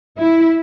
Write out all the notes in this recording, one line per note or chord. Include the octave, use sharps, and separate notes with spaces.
E4